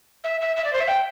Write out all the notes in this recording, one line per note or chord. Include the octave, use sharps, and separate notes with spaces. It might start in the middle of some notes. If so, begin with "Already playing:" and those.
E5
E5
E5
D5
C5
E5
G5